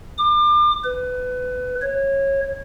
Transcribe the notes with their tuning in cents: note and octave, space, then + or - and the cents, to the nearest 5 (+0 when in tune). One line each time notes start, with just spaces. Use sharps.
D6 +35
B4 +25
C#5 -20